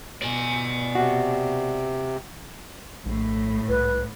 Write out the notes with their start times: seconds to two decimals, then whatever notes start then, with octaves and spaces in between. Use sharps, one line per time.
0.22 B2 D5 G#5
0.95 C3 F#4
3.06 A#1 A2
3.69 C2 B4